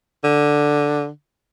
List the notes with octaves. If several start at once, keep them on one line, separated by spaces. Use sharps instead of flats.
D3